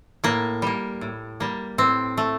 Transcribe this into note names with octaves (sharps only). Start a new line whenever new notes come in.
A2 A#3
G3 A#3
A2
G3 A#3
A2 C4
A3